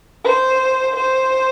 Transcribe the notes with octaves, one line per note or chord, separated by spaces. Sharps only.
C5
C5